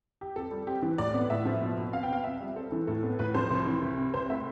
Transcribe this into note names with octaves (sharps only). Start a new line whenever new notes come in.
G4
F2 A4
G3
C4 G4
E3
A2 D5
B3
A2 E5
F3
B2
B2
B3 F5
G5
B3 F5
F2 E5
G3
C4 A4
E3
A2 A4
B3
A2 B4
F3 C5
C2
E3
C2
C3
C2 C5
A3 E5